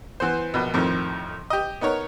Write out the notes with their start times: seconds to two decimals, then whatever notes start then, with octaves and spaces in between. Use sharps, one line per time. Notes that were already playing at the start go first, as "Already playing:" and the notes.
0.20 E3 B3 C5
0.54 A#1 B2
0.74 F2 A2 D#3 F3
1.50 G4 D#5
1.81 B3 D#4 A#4 C#5